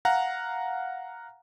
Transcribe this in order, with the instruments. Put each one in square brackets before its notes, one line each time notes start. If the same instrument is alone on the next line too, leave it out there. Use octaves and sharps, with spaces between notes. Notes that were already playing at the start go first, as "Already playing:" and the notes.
[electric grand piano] F5 F#5 A#5